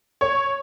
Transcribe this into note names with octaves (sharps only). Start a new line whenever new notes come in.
C#5